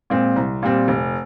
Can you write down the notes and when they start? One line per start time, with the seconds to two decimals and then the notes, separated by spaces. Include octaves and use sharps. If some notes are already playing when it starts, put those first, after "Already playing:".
0.10 A#2 G#3 C4
0.36 C2
0.62 A#2 G3 C4
0.88 F1